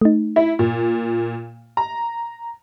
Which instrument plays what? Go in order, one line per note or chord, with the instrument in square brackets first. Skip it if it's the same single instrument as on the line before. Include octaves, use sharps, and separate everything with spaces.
[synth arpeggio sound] A3 D#4
[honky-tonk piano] E4
A#2
A#5